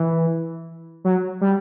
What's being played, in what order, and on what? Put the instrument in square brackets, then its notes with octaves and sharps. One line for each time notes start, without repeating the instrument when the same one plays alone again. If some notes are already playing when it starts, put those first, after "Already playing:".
Already playing: [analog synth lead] E3
F#3
G3